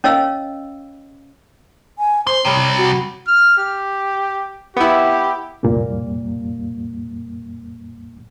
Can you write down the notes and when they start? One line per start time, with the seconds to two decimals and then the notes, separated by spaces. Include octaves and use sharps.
0.04 C#4 C#5 D#5 F5 E6
1.98 G#5
2.27 C5 C6
2.45 C3 G3 C#5
2.78 F#4
3.27 F6
3.58 G4
4.76 B3 E4 G4
5.63 C2 F2 A#2 G3 A#3